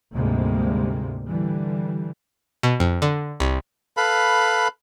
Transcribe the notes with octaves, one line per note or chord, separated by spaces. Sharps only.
D2 G#2 C3 G3 G#3 A#3
D3 E3 G3
B2
F2
D3
C2
A4 B4 F5 B5